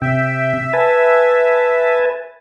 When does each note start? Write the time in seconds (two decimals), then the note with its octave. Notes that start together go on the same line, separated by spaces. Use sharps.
0.02 C3 E5 G5
0.73 B4 G#5 A5